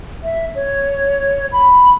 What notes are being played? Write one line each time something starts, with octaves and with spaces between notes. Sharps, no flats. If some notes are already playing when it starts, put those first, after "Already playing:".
E5
C#5
B5